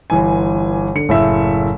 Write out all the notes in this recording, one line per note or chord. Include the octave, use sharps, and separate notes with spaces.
G1 E3 G#5
D3 C#7
F#1 A2 E5